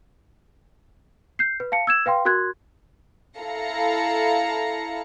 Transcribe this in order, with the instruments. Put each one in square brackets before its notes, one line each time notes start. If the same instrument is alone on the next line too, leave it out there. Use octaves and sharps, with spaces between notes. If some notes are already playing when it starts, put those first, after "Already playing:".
[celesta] G6 C7
B4
F5 A5 C#7
E6 G#6 E7
B4 F5 G5 C6
F#4 A#4 C6 F#6 G#6
[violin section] E4 A4 F5 A#5 A#6 C#7